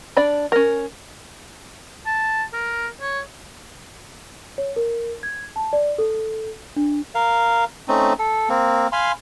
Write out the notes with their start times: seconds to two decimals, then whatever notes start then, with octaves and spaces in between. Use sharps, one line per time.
0.17 D4 D5 B5
0.52 C#4 A#4
2.06 A5
2.53 A#4
3.01 C#5
4.58 C#5
4.76 A#4
5.23 G#6
5.56 A5
5.73 D5
5.98 A4
6.76 D4
7.15 A#4 F5
7.88 A3 C4 C#4 D#4
8.19 A4
8.49 A#3 C4
8.92 F5 G#5 B5 C6